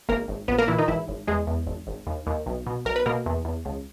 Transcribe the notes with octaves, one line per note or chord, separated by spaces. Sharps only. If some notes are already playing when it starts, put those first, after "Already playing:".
G#1 A#3 A#4
G#1
A#1 B3 B4
A#3 A#4
A#2 E3 E4
D#3 D#4
G#1 E3 E4
G#1
E2 G#3 G#4
E2
G#1
G#1
D#2
D#2
B1
B2
B1 A#4
B4
B2 A#3 A#4
E2
E2
C#2